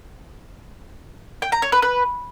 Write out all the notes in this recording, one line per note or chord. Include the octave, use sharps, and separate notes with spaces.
G5
A#5
C#5
B4
B4